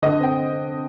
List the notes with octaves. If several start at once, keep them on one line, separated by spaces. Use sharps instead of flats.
D3 D#5
C4 G5